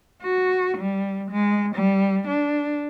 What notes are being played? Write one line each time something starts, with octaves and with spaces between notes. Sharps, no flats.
F#4
G3
G#3
G3
D4